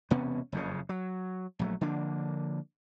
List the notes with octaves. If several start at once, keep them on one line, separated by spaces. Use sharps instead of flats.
E1 C3 B3 C#4
F#1 F2 A2 C#3
F#3
A#1 F#3 A3
D3 F3 A#3 D4